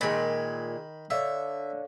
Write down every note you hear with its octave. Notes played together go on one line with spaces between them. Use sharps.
A#2 D#3 G#3 B5
D3 C#5 D5 E5 F5